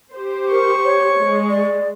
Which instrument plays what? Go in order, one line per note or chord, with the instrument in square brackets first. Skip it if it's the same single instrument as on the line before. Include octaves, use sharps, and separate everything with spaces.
[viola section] G4 C5
[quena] A#4 [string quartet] C#6
[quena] C#5
[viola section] G#3
[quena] D5